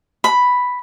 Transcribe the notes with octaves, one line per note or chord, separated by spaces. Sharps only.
B5